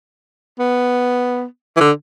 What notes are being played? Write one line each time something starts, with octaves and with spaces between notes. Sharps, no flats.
B3
E3
D3